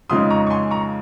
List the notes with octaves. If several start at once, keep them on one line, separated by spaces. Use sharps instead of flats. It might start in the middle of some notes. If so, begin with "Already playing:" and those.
F2 C#3 G#3 D#4 C6 D#6
A#5 C#6
C#6
G#5 C6
A#5 C#6